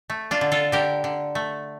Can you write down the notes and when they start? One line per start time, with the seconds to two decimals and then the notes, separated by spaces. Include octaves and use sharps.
0.10 A3
0.31 D4 F4
0.41 D3
0.52 F4 A4
0.72 D3 G4 A#4
1.04 D3
1.35 A3